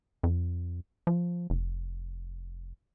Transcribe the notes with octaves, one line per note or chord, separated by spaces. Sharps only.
F2
F3
F1